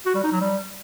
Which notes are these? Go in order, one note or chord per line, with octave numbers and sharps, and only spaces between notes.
F#4
G3
D#4
F#3
G3